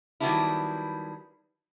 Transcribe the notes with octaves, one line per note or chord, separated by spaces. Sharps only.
D#3 F#3 G3 B3 D4 E4